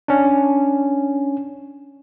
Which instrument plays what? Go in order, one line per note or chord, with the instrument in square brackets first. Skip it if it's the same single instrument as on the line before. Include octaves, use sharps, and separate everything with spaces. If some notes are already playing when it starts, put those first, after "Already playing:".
[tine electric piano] C#4 D4